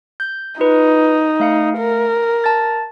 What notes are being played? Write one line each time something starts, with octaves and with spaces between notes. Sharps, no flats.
G6
D#4 F4 B4
A3 F5 C#7
A#4
A5 A6